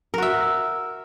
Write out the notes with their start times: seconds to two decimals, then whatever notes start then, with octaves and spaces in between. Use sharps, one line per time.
0.14 A#4
0.18 F#4
0.22 E5